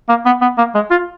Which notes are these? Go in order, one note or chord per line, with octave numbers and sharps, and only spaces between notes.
A#3
B3
B3
A#3
G#3
F4